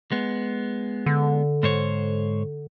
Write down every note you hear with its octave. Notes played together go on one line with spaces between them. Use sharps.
G#3 B3
D3
G#2 C5 C#5